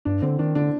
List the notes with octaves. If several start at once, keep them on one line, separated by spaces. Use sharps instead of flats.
G2 D4
D3 C4
D#3 D4
D3 D4